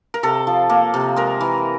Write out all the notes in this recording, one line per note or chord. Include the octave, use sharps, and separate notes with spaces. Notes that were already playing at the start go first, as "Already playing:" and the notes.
A#4
C3 A4
F3
A#3
C3
G#3 A#4
E3